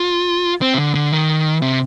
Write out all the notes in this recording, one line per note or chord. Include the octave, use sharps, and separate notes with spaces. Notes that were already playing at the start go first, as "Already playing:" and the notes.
Already playing: F4
C4
C3
D3
D3
D#3
C3